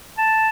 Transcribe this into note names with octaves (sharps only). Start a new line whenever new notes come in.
A5